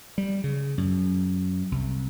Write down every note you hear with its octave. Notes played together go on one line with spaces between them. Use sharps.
G3
C#3
F#2
C2